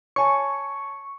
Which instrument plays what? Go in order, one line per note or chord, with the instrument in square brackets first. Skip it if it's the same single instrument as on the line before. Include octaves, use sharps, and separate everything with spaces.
[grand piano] C#5 G#5 A5 [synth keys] C#6